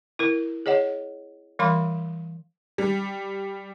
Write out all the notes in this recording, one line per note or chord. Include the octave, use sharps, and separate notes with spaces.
E4 A#4
G#4 C#5 D#5 F#5
E3 G3 A#4 F5 B5 C6
G3